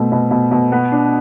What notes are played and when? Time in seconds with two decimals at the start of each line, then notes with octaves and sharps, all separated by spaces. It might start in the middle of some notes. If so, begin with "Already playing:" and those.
Already playing: B2 A3 C4
0.12 B2
0.31 B2
0.51 B2
0.72 B3
0.92 D4